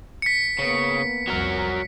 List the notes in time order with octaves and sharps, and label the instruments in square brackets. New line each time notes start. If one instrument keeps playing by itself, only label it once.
[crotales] B6 C#7
[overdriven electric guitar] C#3 [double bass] A#3 B3
[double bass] C2 F2 [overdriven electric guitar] F#3 A#4